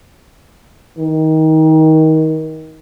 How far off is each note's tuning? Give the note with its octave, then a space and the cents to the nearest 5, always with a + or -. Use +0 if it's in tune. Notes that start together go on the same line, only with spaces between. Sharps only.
D#3 +25